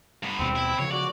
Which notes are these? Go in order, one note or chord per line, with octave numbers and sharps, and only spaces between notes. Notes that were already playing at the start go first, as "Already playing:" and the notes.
G2 B3
D#2 B2 C4
E4
C#3 F3 C#5
F#4 D5